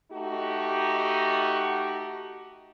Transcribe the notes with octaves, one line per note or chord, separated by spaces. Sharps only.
A3 D#4 F#4 G4